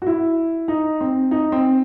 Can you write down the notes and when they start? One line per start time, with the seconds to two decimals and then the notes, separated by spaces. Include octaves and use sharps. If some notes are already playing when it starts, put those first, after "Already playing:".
0.02 F#4
0.07 E4
0.68 D#4
1.01 C4
1.31 D#4
1.52 C4